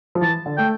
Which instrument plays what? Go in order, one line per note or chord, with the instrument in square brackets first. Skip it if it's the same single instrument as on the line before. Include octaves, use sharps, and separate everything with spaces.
[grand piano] F3
[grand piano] E3 [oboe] A5
[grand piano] D3
[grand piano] A3 [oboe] G5